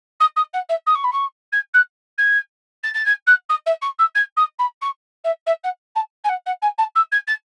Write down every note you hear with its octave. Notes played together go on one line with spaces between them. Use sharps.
D#6
D#6
F#5
E5
D#6
C#6
B5
C#6
G#6
F#6
G#6
A6
A6
G#6
F#6
D#6
E5
C#6
E6
G#6
D#6
B5
C#6
E5
E5
F#5
A5
G#5
F#5
F#5
G#5
A5
E6
G#6
A6